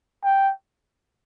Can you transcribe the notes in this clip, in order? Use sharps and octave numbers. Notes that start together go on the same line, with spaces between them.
G5